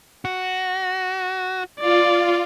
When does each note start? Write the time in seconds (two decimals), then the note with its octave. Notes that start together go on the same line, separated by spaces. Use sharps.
0.25 F#4
1.80 F4 D5